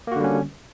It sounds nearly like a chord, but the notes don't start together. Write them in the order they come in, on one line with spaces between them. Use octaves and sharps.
A#3 F#4 D3 G3 C#4